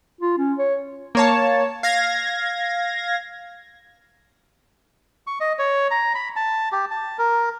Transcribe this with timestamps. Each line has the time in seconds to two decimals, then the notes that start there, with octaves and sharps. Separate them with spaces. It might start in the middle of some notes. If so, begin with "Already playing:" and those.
0.21 F4
0.38 C#4
0.59 C#5
1.15 A#3 C#5 A5
1.83 F5 G#6 A#6
5.27 C#6
5.40 D#5
5.59 C#5
5.91 A#5
6.15 B5
6.36 A5
6.72 G4
6.91 A5
7.18 A#4